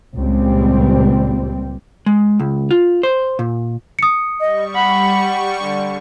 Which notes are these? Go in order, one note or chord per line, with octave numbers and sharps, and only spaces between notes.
C#2 A#2 G3 C4
G#3
C#2
F4
C5
A#2
D#6 C#7
G3 D#5 C#6
F#5 B5
D3